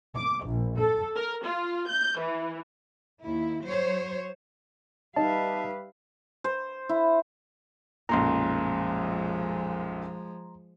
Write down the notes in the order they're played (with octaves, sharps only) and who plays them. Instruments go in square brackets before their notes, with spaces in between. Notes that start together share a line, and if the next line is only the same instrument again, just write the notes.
[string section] D6
A#1
A4
A#4
F4
G6
E3
[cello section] D#2 E4
F#3 C5 C#5
[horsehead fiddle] G3 B4 [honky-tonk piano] D#4 [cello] E5 F5 [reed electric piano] A5
[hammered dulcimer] C5
E4
[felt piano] B1 F#2 A#2 [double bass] F3 G#3 [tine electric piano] A#5 C6